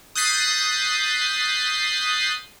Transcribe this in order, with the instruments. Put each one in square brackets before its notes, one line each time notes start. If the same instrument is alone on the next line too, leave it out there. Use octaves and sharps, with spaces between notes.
[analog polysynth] D#6 F#6 G6 A6 B6 C7